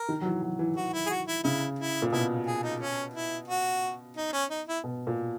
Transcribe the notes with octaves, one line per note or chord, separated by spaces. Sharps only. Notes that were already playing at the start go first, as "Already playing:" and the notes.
Already playing: A#4
D#3
F#3
E3
F#3
E3
E3 F#4
E4
G#4
F#4
E4
C#3 E4
E4
A#2
B2 E4
G#4
D#4
C#4
E4
F#4
D#4
C#4
D#4
E4
B2
A#2